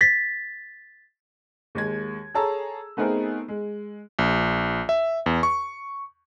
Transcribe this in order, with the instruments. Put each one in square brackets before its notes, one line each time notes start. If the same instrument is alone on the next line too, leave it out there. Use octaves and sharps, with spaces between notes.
[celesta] A6 B6
[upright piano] D#2 G#3 G#6
G#4 A4 C#5 A5 A#5 E6
A3 B3 C4 D#4 G#4 A#4
G#3
[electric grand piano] A#1
E5
E2
C#6